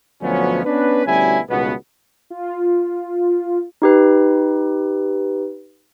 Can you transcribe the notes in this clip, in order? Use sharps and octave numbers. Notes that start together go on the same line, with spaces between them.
D2 B2 F3 F#3 B3 C#4
B3 C#4 D4 B4
D2 B2 G3 C#4 E4 G#5
C#2 G2 B2 D#3 B3
F4
D#4 G4 B4